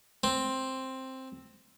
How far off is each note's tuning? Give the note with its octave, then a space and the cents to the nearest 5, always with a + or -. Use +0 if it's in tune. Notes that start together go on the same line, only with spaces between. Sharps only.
C4 +5